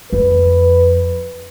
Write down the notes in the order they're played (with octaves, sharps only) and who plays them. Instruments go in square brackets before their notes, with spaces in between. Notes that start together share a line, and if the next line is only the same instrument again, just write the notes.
[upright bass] F2 [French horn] B4